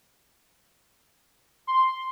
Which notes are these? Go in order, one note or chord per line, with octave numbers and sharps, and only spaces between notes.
C6